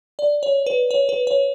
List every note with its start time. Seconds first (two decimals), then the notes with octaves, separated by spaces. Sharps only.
0.19 D5
0.43 C#5
0.66 B4
0.91 C#5
1.09 B4
1.27 C#5